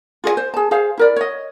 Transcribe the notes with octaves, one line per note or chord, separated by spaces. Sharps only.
F4 G#4 C#5 G#5
C5
G#4 A5
G#4 C5 F5
E4 A#4 D5
C#5 D#5